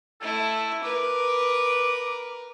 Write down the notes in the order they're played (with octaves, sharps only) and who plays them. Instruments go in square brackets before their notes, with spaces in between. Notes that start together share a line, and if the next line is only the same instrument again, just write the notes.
[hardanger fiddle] A3 E4 [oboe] A4
[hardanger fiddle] A#4 B4 [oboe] D6